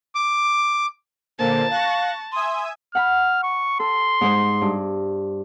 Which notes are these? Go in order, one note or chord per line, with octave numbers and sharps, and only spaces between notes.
D6
A#2 D3 A#3 C5 A5
F5 C#6 F#6 A#6
E5 G#5 C6 D#6
F#5 B5 F6
C#6
A4 C6
G#2 G#3 C5
G2